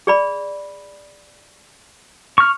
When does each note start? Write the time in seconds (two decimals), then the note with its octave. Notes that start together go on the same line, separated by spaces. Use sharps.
0.07 G#4 D5 B5
2.38 C#6 F6